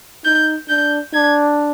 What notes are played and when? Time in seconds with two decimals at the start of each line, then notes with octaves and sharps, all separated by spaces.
0.25 D#4 G6
0.69 D4 G6
1.13 D4 G#6